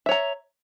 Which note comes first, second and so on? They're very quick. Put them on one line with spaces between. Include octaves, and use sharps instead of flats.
E5 C#5 A#5